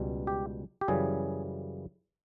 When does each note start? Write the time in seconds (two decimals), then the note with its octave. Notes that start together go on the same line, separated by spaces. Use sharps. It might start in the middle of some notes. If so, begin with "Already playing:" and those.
Already playing: C#2 B2 G3
0.27 G4
0.81 G4
0.88 F#2 C#3 E3 G3 G#4